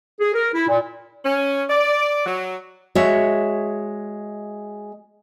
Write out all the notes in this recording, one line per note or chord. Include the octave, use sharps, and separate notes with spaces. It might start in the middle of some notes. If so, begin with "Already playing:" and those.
G#4
A#4
E4
A#2
C#4
D5
F#3
G#3 F#4 C#5 E5